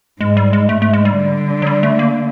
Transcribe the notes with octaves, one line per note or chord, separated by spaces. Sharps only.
G#2 G#3
G3
G#3
G#2 A3
A3
G#3
G3
D3
F#3
G3
A3
A#3